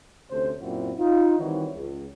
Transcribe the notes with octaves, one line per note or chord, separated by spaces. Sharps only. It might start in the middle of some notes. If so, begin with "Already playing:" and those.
D2 C3 C#4 A4 C5
F#2 A#2 C4 E4 F#4
D#4 F4
D#3 E3 G3 C4 F#4 C#5
C#2